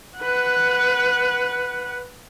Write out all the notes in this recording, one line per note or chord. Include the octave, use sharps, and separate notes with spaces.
B4 F#5